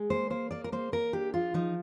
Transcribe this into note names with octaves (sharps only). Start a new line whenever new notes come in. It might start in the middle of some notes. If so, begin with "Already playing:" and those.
Already playing: G#3
A#3 C5
A#3 C5
A#3 D5
A#4
A#3 C5
A#3 A#4
D4 G4
F3 F4
F3 D#4